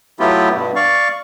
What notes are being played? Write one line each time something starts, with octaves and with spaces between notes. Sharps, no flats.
F#3 A3 B3 E4 F4 G4
G2 B2
D5 F5 C#6